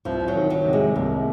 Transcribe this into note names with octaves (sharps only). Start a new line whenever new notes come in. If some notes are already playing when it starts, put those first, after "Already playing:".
C2 F3
F#3
D#3
F#3
C3
G#3
C2 A#3